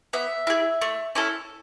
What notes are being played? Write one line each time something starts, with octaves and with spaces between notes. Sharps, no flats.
B3 E5
E4 G#4
A3
C#4 E4 A4